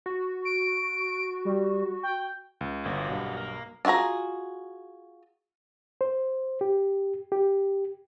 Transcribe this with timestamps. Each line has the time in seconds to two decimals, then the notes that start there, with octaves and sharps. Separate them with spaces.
0.06 F#4
0.45 D7
1.45 G3
2.03 G5
2.61 C#2
2.85 G1 A#3 F#4
3.08 B1 G2
3.37 A#3
3.85 D4 F4 F#4 G#4 A#5
6.01 C5
6.61 G4
7.32 G4